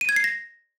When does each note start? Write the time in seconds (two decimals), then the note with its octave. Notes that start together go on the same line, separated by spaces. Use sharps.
0.01 D#7
0.09 G#6
0.16 C7
0.24 A#6